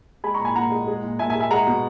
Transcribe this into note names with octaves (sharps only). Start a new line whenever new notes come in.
G#3 G#5 B5
A#2 A#5 C#6
G#5 B5
A#2 F#5 A#5
G#3
G#3
A#2
A#2 E5 G#5
E5 G#5
G#3
E5 G#5
G#3 F#5 A#5
B2